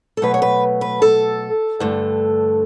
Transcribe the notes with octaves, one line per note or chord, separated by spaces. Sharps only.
A4
B2 F#3 A3 B4
C#5
B4
B4
A4
G2 D3 A3